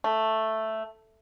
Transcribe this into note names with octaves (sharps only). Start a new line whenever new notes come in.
A3